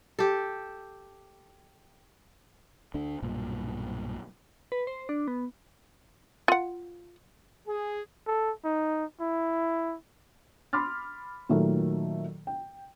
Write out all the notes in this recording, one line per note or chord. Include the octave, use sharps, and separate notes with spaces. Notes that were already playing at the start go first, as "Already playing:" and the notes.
G4 A4
D2 A3 D4
B1 G2 A#2
B4
C5
D4
B3
F4 F#5
G#4
A4
D#4
E4
B5 C6 D6 F6 A6
A#2 D#3 F#3 A3
G5